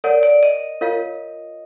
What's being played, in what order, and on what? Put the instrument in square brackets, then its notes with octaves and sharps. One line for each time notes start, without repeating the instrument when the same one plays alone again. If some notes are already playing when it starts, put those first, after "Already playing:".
[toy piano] A#4 C#5 F#5 [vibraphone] D5
[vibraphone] D5
D#5
[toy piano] F4 A#4 C#5 F5